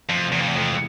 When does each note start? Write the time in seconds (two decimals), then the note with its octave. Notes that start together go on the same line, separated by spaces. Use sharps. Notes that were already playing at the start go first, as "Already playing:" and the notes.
0.09 F2 C3 E3 A3 C4
0.32 E2
0.40 F2
0.47 E2
0.55 F2 C3 E3 G#3